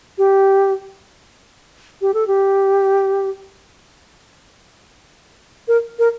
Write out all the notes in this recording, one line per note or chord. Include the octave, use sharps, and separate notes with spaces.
G4
G4
A4
G4
A#4
A#4